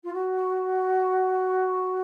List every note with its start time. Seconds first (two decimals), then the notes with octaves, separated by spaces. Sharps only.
0.04 F4
0.13 F#4